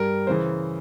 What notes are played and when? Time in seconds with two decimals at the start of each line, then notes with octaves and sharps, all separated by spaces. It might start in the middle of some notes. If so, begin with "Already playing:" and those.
Already playing: G2 G3 A#4
0.27 C#3 E3 C5